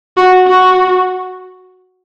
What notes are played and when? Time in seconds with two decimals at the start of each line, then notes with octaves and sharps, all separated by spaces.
0.17 F#4
0.47 F#4